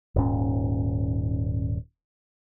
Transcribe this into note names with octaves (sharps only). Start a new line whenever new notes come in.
D#1 G#2 C#4